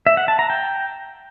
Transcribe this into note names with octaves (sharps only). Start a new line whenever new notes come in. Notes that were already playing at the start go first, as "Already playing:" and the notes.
E5
F#5
A5
A#5
G5